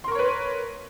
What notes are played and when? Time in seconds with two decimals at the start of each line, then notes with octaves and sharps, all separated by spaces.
0.04 C6
0.08 A#4
0.12 C#6
0.15 C#5
0.19 B4